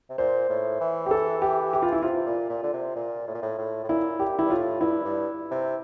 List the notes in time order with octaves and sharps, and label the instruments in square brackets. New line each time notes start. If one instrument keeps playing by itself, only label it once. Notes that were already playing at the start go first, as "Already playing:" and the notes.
[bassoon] C3
[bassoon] A#2 [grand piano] C5
[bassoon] A2
E3
[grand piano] G4
A4
G4
G4
F4
E4
[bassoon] C3 [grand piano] F4
[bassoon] A#2
A#2
D3
C3
A#2
A2
A#2
A2
A2
A2
[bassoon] A#2 [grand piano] E4
[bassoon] A#2 [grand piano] G4
[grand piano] E4
[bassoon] G2
[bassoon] A2 [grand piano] F4
[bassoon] G2 [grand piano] E4
[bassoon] G2
C3